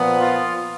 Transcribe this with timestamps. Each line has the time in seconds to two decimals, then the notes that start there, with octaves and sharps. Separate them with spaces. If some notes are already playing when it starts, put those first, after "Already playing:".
Already playing: A#2 F3 B3
0.21 F4